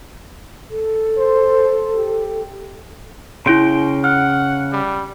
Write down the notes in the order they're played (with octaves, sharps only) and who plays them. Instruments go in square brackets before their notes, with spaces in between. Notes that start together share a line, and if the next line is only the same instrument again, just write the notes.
[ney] A4
[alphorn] C5
G4
[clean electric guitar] C#3 G5 [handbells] E4 C6
[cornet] F#5 [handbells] F6
[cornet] G3